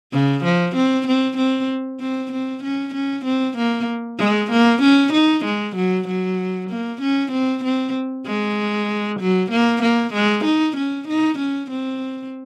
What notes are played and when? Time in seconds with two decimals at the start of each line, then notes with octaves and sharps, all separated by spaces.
0.13 C#3
0.44 F3
0.76 C4
1.07 C4
1.37 C4
2.00 C4
2.32 C4
2.63 C#4
2.94 C#4
3.25 C4
3.57 A#3
4.19 G#3
4.51 A#3
4.82 C#4
5.13 D#4
5.45 G#3
5.76 F#3
6.08 F#3
6.70 A#3
7.01 C#4
7.32 C4
7.64 C4
8.27 G#3
9.20 F#3
9.51 A#3
9.82 A#3
10.14 G#3
10.45 D#4
10.77 C#4
11.08 D#4
11.38 C#4
11.70 C4